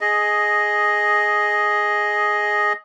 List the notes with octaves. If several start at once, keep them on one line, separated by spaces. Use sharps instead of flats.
G#4 D#5